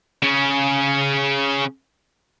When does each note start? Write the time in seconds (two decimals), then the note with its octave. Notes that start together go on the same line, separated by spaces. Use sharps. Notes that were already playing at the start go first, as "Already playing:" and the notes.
0.23 C#3 C#4